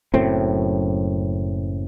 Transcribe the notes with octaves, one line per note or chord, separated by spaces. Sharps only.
F#1 F#2 A2 C4